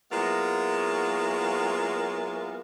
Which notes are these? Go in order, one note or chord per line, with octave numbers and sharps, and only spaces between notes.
F#3 G#3 A#3 B3 E4 F4